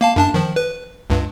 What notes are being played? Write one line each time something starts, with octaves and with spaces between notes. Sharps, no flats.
A#3 F5 A5
F#2 D4 A5
D#3 F3
B4
C#2 G2